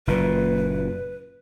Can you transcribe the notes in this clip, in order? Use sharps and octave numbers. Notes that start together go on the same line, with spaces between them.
F#1 A#2 B4